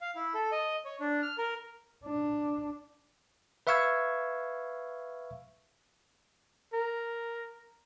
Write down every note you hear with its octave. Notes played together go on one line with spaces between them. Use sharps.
F5
E4
A4
D#5
C#5
D4
F6
A#4
D4
B4 E5 F5 C#6 E6 G#6
A#4